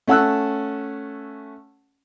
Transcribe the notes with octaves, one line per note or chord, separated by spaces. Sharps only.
A3 C#4 F#5 A5 E6 F#6